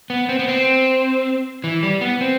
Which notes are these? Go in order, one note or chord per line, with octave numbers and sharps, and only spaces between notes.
B3
C4
B3
C4
E3
G3
B3
C4